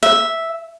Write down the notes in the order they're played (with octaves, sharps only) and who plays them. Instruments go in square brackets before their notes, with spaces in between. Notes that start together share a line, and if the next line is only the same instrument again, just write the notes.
[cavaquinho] E5